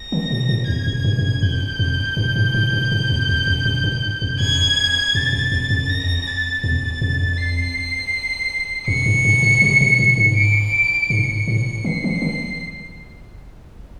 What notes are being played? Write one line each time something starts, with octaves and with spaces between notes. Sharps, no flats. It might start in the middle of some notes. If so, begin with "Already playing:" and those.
Already playing: A#6
D#3
A#2
A2
E2 G#6
F2
G2
G2
F#2
F2 G6
F2
G2
G#2
G#2
G2
G#2
E2
E2
F2
F#2
G2
F2
F2 G#6
F2 A6
F2
E2
F2
F#2
A#6
F2
A6
E2 A6
F2
C7
F2 C#7
G2
G#2
G#2
C3
B2
A2
G#2
D7
G#2 C#7
A2
D#3 C7
E3
D#3